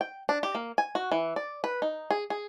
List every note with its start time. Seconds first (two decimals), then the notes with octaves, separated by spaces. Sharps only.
0.01 G5
0.29 D4
0.43 G4
0.55 A#3
0.78 G#5
0.95 F#4
1.12 E3
1.36 D5
1.64 B4
1.82 D#4
2.11 G#4
2.30 G#4